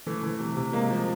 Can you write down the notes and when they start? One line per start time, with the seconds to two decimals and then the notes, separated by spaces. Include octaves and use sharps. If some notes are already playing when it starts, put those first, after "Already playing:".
0.07 E3 A3
0.23 E3
0.40 C3
0.57 C3
0.73 G#3 A#3
0.90 F3